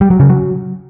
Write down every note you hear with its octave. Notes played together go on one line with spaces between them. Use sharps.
G3
F#3
C#3
F#3